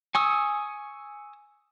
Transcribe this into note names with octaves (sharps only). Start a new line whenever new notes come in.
G#5 C#6 D#6 E6